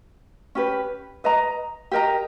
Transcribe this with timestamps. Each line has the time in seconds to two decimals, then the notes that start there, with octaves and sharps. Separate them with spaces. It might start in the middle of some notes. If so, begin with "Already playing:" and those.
0.55 C#4 G4 B4
1.24 B4 D#5 A#5
1.91 G4 A#4 D#5 A#5